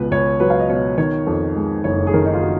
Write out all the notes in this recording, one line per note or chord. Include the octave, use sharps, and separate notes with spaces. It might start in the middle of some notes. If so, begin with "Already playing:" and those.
Already playing: C#2 B2 B4
C#2 C#5
F#3 B4
F5
D#5
B2 C#5
D#3 C#5
F2
G#3
F#1 C#5
G#4
D#3 A#4
D#4
F4
F#4